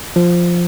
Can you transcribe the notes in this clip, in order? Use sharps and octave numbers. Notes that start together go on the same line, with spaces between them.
F3